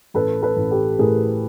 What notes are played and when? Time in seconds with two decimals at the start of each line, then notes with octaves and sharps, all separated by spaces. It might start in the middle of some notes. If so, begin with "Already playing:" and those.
0.14 A1 A4 B4
0.43 A4 B4
0.56 A1
0.71 G4 A4
0.99 A2 G#4 A#4